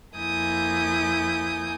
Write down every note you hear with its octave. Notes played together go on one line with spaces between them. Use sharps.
F2 A#3 E4 G#5 D#6 G6